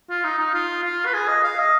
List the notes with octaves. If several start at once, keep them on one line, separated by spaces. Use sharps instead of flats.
F4
D#4
D#4
F4
F4
B4
G#4
D#5
F5
D#5